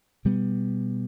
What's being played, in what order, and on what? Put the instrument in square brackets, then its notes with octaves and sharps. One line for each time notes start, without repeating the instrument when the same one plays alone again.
[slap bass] B2 G3 B3